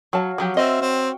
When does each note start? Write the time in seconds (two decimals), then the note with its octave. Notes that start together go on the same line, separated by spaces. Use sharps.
0.13 F#3 F#4 C#5 F5 A5
0.38 F3 F#3 G4
0.57 C4 D#5 E5
0.81 C4 G5